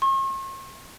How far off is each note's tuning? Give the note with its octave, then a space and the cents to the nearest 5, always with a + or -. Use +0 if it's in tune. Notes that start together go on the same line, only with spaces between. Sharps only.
C#6 -45